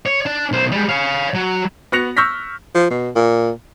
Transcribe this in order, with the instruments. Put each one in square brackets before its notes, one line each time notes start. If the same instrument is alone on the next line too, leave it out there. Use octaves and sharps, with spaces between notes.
[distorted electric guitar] C#5
D4
B1 C5
G3 G#3
C#5 F5
F#3
[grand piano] B3 F#4 F#6 A#6 C#7 F7
C#6 E6 F6 G6 A#6 B6
[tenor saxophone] F3
B2
A#2